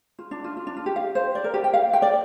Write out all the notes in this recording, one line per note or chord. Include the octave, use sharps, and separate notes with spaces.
F4
D4
F4
F4
D4
F4
G4
F5
C5
D5
A#4
G4
G5
F5
G5
D5